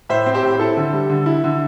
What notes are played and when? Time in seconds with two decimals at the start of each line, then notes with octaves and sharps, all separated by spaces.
0.09 A2 C5 E5
0.26 C4
0.34 G4 C5
0.43 A2
0.59 E4 A4
0.77 D3
0.93 G3
1.09 D3
1.26 E4
1.44 D3